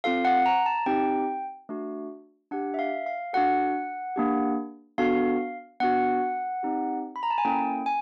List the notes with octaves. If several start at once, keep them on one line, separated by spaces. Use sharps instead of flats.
C4 F4 A4 F5
F#5
A#5
A5
C4 D#4 G4 G5
A3 D4 F#4
D4 G4 F#5
E5
F5
F5
D4 F#4 A4 F#5
A#3 D4 G4
B3 D4 F#4 A4 F5
B3 D4 F#4 F#5
C4 D#4 G4
B5
A#5
A5
G#5
A#3 C#4 E4 A4 G5
G#5